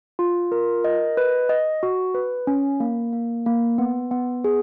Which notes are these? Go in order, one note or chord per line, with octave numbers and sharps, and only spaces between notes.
F4
A#4
D#5
B4
D#5
F#4
B4
C#4
A#3
A#3
A#3
B3
B3
G#4